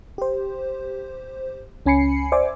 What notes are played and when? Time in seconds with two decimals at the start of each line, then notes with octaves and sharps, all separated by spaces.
0.18 G4 C5
1.86 C#2 C#4 G#5 B5 C7 C#7
2.32 C5 D5 E5 G#5 D6